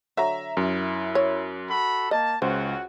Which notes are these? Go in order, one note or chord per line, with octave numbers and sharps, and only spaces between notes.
D3 F#3 E5 A#5
F#2 E4
C#5
F#4 A4 B5
A#3 D#5 A5
C#2 C#4 F#4 C5